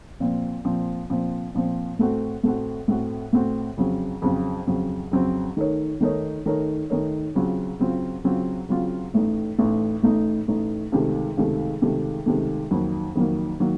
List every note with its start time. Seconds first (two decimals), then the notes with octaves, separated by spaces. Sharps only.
0.20 A#2 F3 C4
0.65 A#2 F3 C4
1.10 A#2 F3 C4
1.54 A#2 F3 C4
1.99 A2 A3 C4 F#4
2.43 A2 A3 C4 F#4
2.88 A2 A3 C4 F#4
3.33 A2 A3 C4 F#4
3.78 F2 C#3 F#3 C4
4.22 F2 C#3 F#3 C4
4.67 F2 C#3 F#3 C4
5.11 F2 C#3 F#3 C4
5.57 D#3 A3 D#4 A#4 C#5
6.01 D#3 A3 D#4 A#4 C#5
6.46 D#3 A3 D#4 A#4 C#5
6.90 D#3 A3 D#4 A#4 C#5
7.35 C#3 F#3 C4 F4
7.79 C#3 F#3 C4 F4
8.24 C#3 F#3 C4 F4
8.69 C#3 F#3 C4 F4
9.14 A1 A2 A3 D#4
9.59 A1 A2 A3 D#4
10.03 A1 A2 A3 D#4
10.48 A1 A2 A3 D#4
10.92 C#2 C3 D#3 A3
11.37 C#2 C3 D#3 A3
11.82 C#2 C3 D#3 A3
12.26 C#2 C3 D#3 A3
12.71 F2 D#3 F#3 A#3
13.15 F2 D#3 F#3 A#3
13.60 D#3 F#3 A#3